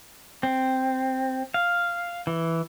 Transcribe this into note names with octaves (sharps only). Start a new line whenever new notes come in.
C4
F5
E3